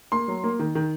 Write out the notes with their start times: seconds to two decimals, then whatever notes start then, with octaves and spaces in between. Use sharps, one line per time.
0.12 A#3 C6
0.28 F#3
0.44 A#3
0.59 D#3
0.75 D#3